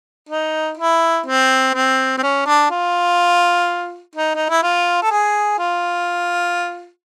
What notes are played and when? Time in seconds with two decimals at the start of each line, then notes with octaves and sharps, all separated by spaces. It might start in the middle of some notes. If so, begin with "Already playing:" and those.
0.29 D#4
0.77 E4
1.26 C4
1.74 C4
2.17 C4
2.23 C#4
2.46 D4
2.70 F4
4.15 D#4
4.35 D#4
4.49 E4
4.63 F4
5.02 A4
5.11 G#4
5.59 F4